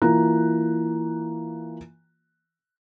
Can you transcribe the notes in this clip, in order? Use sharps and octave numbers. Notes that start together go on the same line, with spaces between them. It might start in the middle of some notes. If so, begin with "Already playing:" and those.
E3 A#3 F4 A#5 F#6